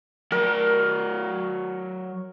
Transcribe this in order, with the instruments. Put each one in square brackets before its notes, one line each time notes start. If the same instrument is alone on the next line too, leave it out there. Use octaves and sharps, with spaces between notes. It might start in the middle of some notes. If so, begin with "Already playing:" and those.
[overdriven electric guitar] F#3 D5 [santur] A#4